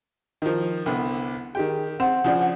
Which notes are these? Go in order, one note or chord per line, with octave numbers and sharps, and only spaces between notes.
D#3 F3
C2 D3 B3
D#3 G4 G#4 G5
C4 F#5
C#3 F3 D4